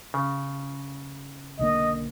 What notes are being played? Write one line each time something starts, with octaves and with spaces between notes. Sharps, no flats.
C#3
B1 D3 A#3 D#5